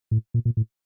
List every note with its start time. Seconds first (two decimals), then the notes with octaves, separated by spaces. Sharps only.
0.11 A2
0.34 A#2
0.45 A#2
0.57 A2